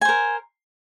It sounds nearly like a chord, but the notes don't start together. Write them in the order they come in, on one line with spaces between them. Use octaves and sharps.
G#5 C5 A#4